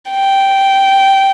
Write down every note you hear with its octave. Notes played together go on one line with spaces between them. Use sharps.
G5